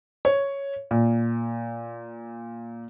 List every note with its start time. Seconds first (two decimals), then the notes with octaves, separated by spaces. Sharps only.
0.25 C#5
0.91 A#2